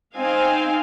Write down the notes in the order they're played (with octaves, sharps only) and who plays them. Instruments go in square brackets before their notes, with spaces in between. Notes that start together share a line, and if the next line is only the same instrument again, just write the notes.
[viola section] C4 D#4 F5 G#5